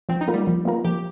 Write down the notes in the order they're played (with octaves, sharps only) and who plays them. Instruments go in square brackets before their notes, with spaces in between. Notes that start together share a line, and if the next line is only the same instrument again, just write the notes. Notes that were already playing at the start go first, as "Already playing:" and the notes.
[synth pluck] F3 [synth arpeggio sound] C4
[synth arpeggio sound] D#4
[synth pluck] A#3 F4 A#4
[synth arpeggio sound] G3
[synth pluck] F3
A#3 F4 A#4
[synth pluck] F3 [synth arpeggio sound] G4